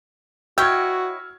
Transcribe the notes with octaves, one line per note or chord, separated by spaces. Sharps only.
E4 F#4 C#5 D#5 G5 E6 F6 G#6